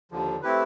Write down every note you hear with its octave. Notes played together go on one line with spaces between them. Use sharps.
D#2 D3 F3
A3 C4 E4 G4 B4